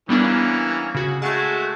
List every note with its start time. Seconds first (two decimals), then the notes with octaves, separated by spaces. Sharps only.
0.09 E3 G3 A#3 B3 C#4 D4
0.95 C#3 F#4
1.22 G#3 A3 F#4 A5 G#6